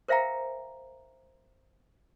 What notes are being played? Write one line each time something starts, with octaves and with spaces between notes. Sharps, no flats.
A#4 C5 E5 F5 G5 A#5